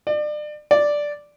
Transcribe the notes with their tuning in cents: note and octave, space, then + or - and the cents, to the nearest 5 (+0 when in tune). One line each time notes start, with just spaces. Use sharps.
D5 +35
D5 +0